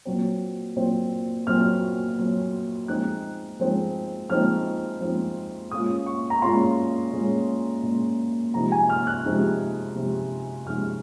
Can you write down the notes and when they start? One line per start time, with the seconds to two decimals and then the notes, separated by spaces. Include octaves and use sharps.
0.05 A#2 F#3 C4
0.76 A#2 F#3 C4
1.47 A#2 F#3 C4 F6
2.18 A#2 F#3 C4
2.88 F3 G#3 C4 D#4 F#6
3.60 F3 G#3 C4 D#4
4.30 F3 G#3 C4 D#4 F6
5.01 F3 G#3 C4 D#4
5.71 A#2 G#3 C#4 F4 D#6
6.06 C#6
6.30 A#5
6.42 A#2 G#3 C#4 F4 C6
7.13 A#2 G#3 C#4 F4
7.83 A#2 G#3 C#4 F4
8.54 C3 F3 G#3 D#4 A#5
8.72 G#5
8.90 F6
9.07 F#6
9.25 C3 F3 G#3 D#4
9.95 C3 F3 G#3 D#4
10.66 C3 F3 G#3 D#4 F6